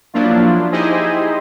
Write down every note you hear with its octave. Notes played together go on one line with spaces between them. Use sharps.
F3 F#3 A#3 D4 E4 F4
D#4 E4 G4 G#4 C5 D#5